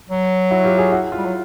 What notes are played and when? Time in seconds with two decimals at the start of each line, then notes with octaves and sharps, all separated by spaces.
0.09 F#3
0.51 E4 F#4
0.64 F4 G4
0.78 F#4 G#4
0.92 E4 F#4
1.12 F4
1.18 G3
1.25 F#3